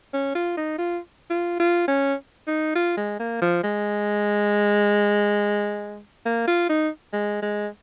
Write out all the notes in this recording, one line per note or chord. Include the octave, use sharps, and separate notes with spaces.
C#4
F4
D#4
F4
F4
F4
C#4
D#4
F4
G#3
A#3
F3
G#3
A#3
F4
D#4
G#3
G#3